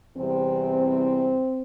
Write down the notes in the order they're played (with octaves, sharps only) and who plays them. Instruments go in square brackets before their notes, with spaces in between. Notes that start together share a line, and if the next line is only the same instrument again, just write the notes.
[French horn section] E2 C3 E3 G3 C4